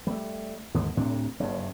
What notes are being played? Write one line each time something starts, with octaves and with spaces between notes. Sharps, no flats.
G3 A3
D#2 G#2 D3 B3
D2 A2 C3 D4
F#1 G2 C#3